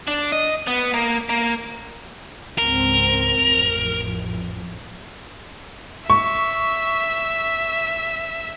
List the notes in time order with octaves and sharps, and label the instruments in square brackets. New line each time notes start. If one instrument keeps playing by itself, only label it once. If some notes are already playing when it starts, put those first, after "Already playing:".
[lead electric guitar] D4
D#5
B3
A#3
A#3
[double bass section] C#2 G#2 C4 [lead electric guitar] A#4
[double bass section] A1 F2
[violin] E5 [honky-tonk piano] C#6